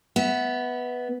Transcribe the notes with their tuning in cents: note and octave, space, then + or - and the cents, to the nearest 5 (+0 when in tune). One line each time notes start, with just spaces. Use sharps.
B3 +0 E5 -25